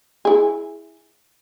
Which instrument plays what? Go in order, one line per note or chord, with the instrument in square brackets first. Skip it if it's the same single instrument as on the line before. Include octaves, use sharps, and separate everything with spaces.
[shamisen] E4 G#4